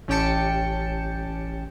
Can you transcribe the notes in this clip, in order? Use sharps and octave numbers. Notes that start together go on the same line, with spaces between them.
A1 C#4 G4 G5 A5 C#7